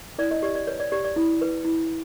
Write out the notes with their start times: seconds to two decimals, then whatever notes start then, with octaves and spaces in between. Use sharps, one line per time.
0.18 E4 D5
0.31 D#5
0.43 G4 D5
0.55 D5
0.67 B4 C#5
0.80 D5
0.92 G4 D5
1.04 D5
1.16 E4
1.41 B4
1.65 E4